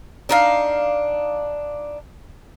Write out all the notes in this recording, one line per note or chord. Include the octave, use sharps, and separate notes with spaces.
D4 D#4 F5